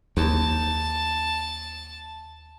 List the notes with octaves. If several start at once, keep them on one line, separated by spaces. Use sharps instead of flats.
D#2 A5